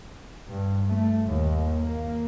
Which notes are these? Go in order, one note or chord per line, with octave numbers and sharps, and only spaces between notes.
G2
A3
D#2
A#3